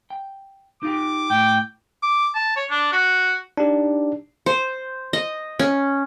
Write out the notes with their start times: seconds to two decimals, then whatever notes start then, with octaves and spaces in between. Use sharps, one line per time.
0.10 G5
0.83 D#4 F4 G4 D6
1.30 A2 G5
2.03 D6
2.35 A5
2.56 C#5
2.70 D4
2.93 F#4
3.57 D4 D#4 G4
4.46 C5
5.13 D#5
5.59 C#4